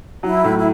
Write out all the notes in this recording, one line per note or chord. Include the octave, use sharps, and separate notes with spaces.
F#3 E4
A2
E4